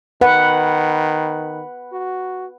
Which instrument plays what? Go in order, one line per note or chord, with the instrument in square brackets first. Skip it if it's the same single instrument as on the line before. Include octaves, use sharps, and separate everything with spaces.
[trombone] D#3 [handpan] B4 F#5
[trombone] F#4